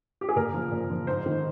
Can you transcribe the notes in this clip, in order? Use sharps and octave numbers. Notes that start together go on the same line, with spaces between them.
G4
G#4
A#2 A#4
F3
A#2
F3
G#2 C5
D#3